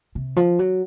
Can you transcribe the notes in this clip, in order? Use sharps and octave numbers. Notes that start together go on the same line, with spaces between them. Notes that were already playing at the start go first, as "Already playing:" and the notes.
C3
F3
F#3